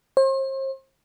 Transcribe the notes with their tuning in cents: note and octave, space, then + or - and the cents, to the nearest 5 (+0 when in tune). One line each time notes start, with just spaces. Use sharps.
C5 +40